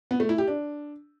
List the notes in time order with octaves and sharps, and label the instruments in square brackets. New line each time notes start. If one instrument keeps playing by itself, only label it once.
[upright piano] B3
A3
E4
G4
D4